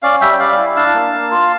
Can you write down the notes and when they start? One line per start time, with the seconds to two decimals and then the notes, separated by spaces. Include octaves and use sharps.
0.03 C#4 D5 F5
0.21 G3 E5 G5
0.33 G5
0.39 G3 D5 F5
0.57 E4
0.76 D4 F5 A5
0.94 A#3
1.13 A#3
1.31 F4